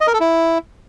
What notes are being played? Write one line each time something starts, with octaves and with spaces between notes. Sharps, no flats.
D#5
A#4
A4
E4